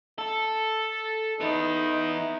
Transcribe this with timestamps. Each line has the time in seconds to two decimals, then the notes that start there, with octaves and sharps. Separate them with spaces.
0.18 A4
1.41 B3 D#4 E4